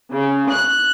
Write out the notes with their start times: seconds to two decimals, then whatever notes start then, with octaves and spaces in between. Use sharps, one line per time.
0.12 C#3
0.51 F#6